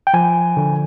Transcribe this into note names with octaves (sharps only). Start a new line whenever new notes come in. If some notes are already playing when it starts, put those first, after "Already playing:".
G5
F3 G#5
D3